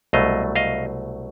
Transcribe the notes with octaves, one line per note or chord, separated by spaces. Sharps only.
C2 B2 F#3 A3 D#5 F5
D#5 F5